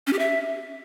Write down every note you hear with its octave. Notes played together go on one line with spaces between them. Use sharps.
C#4
G4
E5